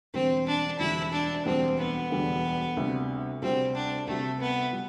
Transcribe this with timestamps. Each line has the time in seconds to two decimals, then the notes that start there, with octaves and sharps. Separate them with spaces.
0.14 E1 D2 D3 G3 C4
0.47 D4
0.79 E1 D2 D3 G3 E4
1.12 D4
1.45 E1 D2 D3 G3 C4
1.78 B3
2.10 E1 D2 D3 G3
2.77 D2 C3 G3
3.42 D2 C3 G3 C4
3.75 D4
4.07 D2 C3 G3 A3
4.40 B3
4.73 G3